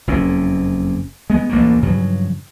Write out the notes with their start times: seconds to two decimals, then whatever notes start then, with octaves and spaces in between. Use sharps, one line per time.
0.07 F#1 F2 A#2 C#4
1.30 G#3 B3
1.49 A1 D2 A3 A#3
1.82 G2 C#3 F3 F#3